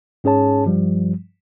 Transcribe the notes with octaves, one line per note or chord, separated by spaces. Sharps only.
G#2 C#4 G#4 C#5 A5
G2 F3 G3